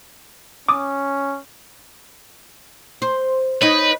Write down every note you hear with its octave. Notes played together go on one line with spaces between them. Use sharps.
C#4 D6 D#6
C5
D#4 B4 C#5